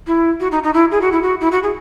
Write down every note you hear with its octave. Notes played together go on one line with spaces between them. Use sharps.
E4
F#4
D#4
D#4
E4
G#4
F#4
E4
F#4
E4
F#4
G#4